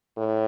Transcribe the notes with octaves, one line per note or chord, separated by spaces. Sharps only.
A2